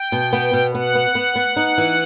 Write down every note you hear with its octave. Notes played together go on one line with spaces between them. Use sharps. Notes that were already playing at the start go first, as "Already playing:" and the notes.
Already playing: G5
B2
B3
B2
B3 F#5
B3
B3
B3
D#4
E3